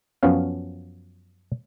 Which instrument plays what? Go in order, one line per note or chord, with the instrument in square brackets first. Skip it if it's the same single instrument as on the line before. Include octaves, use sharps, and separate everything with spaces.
[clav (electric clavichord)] F#2 F3 B3 C#4 F5